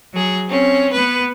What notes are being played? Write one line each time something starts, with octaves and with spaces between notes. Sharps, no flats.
F#3 G#4
C4 C#4
B3 B4